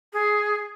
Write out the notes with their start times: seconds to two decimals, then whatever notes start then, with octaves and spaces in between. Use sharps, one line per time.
0.13 G#4